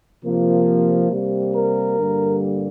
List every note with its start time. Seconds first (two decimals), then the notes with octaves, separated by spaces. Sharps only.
0.24 C3 F3 A#3
1.10 C3 G3 A#3
1.53 A#4
1.98 G2 D3 G3 A#3